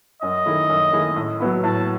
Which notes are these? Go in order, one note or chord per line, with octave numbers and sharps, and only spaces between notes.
F#2 D#5
D#3 A3 E4 G#4
F#2
D#3 A3 E4 G#4
A2
F#3 B3 E4
A2 A5